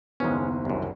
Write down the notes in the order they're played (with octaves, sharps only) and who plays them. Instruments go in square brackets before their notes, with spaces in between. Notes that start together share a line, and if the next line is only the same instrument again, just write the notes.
[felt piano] F#1 D#2 C5 [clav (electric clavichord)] G#3 C#4 [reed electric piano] B3
[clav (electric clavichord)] C2 F#2